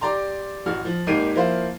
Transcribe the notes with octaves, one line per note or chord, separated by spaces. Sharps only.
G4 D5 A#5 C6
A1 F#4 F6
F3
G#1 A#3 D#4 G4 C7 D#7
F3 A#3 E4 C5 F5